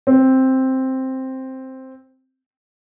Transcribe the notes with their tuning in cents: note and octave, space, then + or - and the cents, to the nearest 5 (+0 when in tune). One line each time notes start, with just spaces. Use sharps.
C4 +5